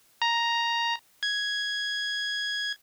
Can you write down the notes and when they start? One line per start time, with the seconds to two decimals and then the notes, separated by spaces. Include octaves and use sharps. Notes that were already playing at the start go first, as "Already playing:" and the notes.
0.22 A#5
1.23 G#6